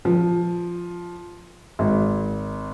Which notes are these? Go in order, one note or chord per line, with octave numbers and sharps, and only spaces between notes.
F3
G#1